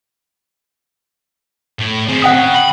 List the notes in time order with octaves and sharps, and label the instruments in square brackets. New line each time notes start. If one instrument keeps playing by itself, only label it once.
[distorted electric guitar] A2
C4 G#4
[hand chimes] F#5 G5 D#6
[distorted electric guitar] C#3
B5